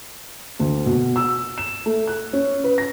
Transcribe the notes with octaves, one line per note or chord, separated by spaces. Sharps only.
D2
B2
E6
E7
A3
F#6
C#4
B4
A#6